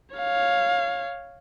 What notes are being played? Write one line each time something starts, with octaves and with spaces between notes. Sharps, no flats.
C#5 F5